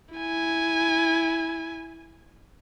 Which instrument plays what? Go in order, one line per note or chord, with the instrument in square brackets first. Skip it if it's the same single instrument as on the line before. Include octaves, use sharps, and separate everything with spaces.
[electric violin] E4 G#5